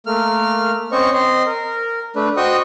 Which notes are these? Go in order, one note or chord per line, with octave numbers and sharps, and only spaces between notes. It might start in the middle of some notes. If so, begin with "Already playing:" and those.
A3 A#3 F6
C4 C#4 C5 D#5 C#6
C4 D#5 C6
A#4
A3 D4 B4
F#4 C5 D#5 G5 C#6 D#6